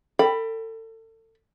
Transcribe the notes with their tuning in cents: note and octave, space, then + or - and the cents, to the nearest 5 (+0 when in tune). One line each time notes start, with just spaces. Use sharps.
A4 +35 G5 +0 B5 +0